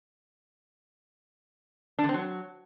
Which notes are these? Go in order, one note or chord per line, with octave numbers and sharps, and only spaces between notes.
D4
D3
C4
F#3